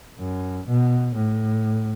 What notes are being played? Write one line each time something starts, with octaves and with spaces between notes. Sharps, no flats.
F#2
B2
A2